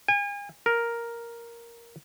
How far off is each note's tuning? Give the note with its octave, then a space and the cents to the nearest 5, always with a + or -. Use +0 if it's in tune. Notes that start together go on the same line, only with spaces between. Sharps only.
G#5 -40
A#4 +5